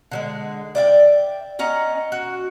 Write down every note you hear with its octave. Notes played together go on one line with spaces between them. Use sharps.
D3 F#3 G#3
D5 E5 F5 G5
C#4 D#5 F#5 A#5
F#4